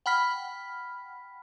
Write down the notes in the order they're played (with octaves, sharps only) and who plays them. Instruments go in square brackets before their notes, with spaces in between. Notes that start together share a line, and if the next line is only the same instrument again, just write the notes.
[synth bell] F#5 G5 B5 F6 B6